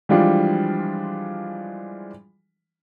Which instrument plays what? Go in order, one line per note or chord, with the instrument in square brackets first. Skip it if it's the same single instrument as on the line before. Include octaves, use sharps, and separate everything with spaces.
[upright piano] E3 F3 G3 G#3 D4 F4